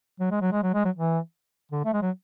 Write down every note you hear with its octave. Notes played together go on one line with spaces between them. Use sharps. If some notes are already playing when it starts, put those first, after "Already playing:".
F#3
G#3
F#3
G#3
F#3
G#3
F#3
E3
D3
A3
G#3
F#3